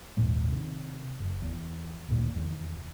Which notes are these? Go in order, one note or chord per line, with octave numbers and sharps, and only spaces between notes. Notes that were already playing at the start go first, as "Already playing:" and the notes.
G#1 D#2 A#2 G#3
C3 D#3
F#1
E2
D2 A#2 D#3
F1 E2 D#3